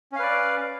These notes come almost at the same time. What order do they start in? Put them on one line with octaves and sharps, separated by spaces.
C#4 F5 B4 D5